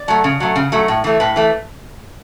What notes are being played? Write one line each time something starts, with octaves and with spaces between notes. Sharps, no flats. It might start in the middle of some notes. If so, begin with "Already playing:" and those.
Already playing: D5
F#3 A3
C#3
F#3 A3
C#3
F#3 A3
A2
E3 A3
A2 B4
E3 A3